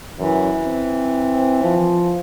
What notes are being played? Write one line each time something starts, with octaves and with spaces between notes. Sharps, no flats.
F#2 E3
C4
F3